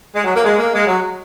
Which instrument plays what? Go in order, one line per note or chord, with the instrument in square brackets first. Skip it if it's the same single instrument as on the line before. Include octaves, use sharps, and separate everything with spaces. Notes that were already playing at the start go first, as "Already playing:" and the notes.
[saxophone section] G#3
F#3
A#3
G#3
A#3
G#3
F#3